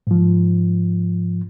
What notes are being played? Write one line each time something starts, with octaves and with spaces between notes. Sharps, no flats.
G#2 F3